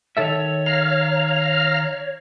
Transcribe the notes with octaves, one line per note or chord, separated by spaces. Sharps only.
D#3 A4 C#5 E5
F5 A#5 F6